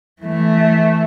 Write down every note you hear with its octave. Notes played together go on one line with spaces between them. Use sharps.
E3 A3